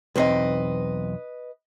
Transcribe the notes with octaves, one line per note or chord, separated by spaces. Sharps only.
B1 E2 C4 B4 D#5